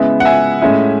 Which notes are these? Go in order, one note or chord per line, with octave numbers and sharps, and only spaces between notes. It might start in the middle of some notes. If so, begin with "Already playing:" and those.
Already playing: C#3 G#3 B3 E4 E5
F#5
E5 G#5
A2 G#3 C#4 E4